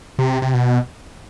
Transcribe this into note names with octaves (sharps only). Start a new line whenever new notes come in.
C3
C3
B2